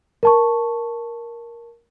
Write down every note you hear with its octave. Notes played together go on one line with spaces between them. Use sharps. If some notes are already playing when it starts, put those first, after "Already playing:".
A#4 A5 C#6